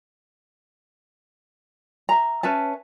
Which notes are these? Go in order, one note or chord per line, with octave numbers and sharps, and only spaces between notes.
E5 A#5
C#4 B4 E5 A5